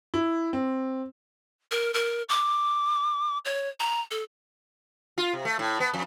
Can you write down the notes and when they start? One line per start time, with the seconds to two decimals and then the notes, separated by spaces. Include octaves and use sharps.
0.14 E4
0.53 C4
1.71 A#4
1.94 A#4
2.29 D6
3.45 C#5
3.80 A#5
4.11 A4
5.18 F4
5.33 C3
5.45 A3
5.59 A2
5.80 B3
5.93 F2